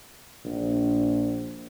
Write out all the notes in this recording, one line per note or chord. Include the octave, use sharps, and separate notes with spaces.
A#1